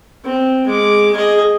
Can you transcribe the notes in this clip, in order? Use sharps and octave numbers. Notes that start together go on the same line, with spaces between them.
C4
G#3 D6
G#4 D#5